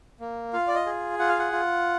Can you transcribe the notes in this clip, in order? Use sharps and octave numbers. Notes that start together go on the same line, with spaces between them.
A#3
F4 F5
D5
D#5
G#4
F4 F#5
F5
F#5
F4